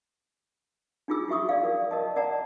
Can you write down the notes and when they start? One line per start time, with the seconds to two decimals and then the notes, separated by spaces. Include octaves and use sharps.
1.08 D4 D#4 F4 G#4 E6
1.28 E4 F#4 E5 C#6 D#6
1.49 D5 F5
1.63 A#4 D5
1.91 A#4 D#5 A5
2.16 D5 F#5 A5 A#5